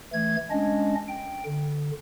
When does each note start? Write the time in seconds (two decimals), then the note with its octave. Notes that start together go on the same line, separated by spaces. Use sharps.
0.13 E3 A3 G#6
0.51 G#3 C#4 D4 D#5
1.08 G5
1.46 D3